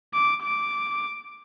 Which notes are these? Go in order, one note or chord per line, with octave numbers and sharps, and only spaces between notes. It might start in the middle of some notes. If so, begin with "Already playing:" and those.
D6
D6